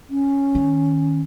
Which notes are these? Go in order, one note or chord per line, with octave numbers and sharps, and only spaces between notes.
C#4
D#3